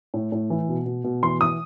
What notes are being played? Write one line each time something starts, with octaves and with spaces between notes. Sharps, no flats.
A2
A2
E3
B2
B2
B2
E3 C6
E3 D#6